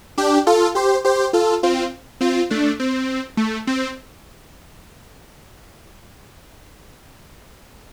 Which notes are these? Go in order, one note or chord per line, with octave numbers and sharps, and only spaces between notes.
D4 G4
F4 A4
G4 C5
G4 C5
F4 A4
C4 F4
C4 F4
A3 D4
C4
A3
C4